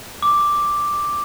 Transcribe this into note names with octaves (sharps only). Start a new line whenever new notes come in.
D6